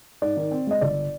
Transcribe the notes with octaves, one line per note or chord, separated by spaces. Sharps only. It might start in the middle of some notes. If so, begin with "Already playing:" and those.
G#2 D5
D#3
C4
G#3 D#5
G1 D5